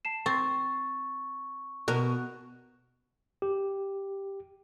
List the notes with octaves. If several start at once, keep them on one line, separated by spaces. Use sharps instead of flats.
A5 C7 E7
C4 C#6 A6
B2 A#4 F#6
G4